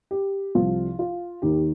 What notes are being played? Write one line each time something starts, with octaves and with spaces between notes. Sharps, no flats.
G4
C2 C3 F3 F4
F4
D#2 D#3 G4